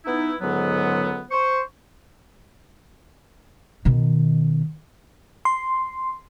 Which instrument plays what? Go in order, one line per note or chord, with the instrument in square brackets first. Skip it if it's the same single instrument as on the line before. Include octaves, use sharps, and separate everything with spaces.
[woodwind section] B3 D#4 E4
C#2 G#2 D3 F#3 B3
C5 C#6
[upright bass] B2 D#3
[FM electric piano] C6